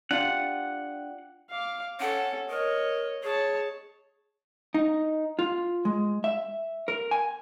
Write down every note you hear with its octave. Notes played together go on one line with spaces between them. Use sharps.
D4 F4 G4 F#5
F5 D6
C#4 A4 F#5
A#4 C#5 D#5
G#4 C#5 A5
D#4
F4
G#3
E5
A#4
G#5